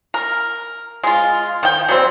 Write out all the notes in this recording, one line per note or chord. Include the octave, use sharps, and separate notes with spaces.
A#4
G#3 F4
D#3 G5
F#3 G3 C4